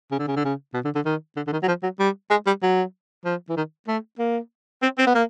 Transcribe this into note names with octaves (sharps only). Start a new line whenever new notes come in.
C#3
D3
C#3
D3
C#3
B2
D3
D3
D#3
D3
D3
D#3
F#3
F3
F#3
G3
G#3
G3
F#3
F3
E3
D#3
A3
A#3
C4
C4
B3
A#3